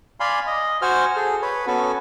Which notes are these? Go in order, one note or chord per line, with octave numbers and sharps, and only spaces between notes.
D5 F5 G#5 B5 C6
D#5
F#4 C5 G#5 F6
G#4 A4
B4 C#5
B3 C#4 F#4 A4